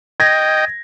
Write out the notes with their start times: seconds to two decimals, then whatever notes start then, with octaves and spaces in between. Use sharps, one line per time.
0.20 D#5 G5 G#6 A#6